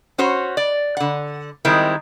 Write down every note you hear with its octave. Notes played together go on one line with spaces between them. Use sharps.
C#4 F#4 C5 C#5
D5
D3 F#5
D#3 G3 G#3 C4 E4 A#4